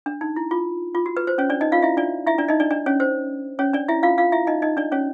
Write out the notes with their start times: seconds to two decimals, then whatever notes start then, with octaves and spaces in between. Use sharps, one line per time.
0.06 D4
0.21 D#4
0.36 E4
0.51 F4
0.95 F4
1.06 F#4
1.17 B4
1.27 C5
1.38 C#4 C#5
1.50 D4 D5
1.61 D#4 D#5
1.72 F4 F5
1.82 E4 E5
1.97 D4 D5
2.27 E4 E5
2.38 D4 D5
2.48 D#4 D#5
2.60 D4 D5
2.70 D4 D5
2.86 C#4 C#5
3.00 C5
3.59 C#4 C#5
3.73 D4 D5
3.88 E4 E5
4.03 F4 F5
4.18 F4 F5
4.32 E4 E5
4.47 D#4 D#5
4.62 D#4 D#5
4.77 D4 D5
4.92 C#4 C#5